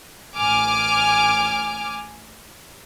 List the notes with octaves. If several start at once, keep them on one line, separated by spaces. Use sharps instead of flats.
A1 G#5 D6 F6